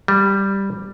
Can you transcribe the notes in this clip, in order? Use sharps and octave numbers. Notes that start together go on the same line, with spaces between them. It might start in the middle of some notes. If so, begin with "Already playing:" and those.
G3